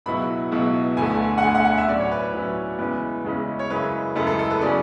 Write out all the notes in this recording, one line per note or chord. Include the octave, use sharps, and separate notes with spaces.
C#2 B2 F#3 B3 E4 B5
C#2 B2 F#3 B3 E4
D2 D3 A3 G#5
F#5
D2 D3 A3 G#5
F#5
F#5
E5
A2 F#3 C#4 E4 D5
C#5
B4
B4
A2 F#3 C#4 E4 B4
E2 C#3 G#3 C#4 E4 B4
E2 C#3 G#3 C#4 E4
C#5
F#2 C#3 G#3 C#4 E4 B4
F#2 C#3 G#3 C#4 E4 A4
A4
A4
B4
C#3 F#3 C#4 D5